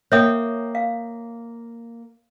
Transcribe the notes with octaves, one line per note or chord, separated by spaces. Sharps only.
A#3 C#5 E5 G5 D#6
F5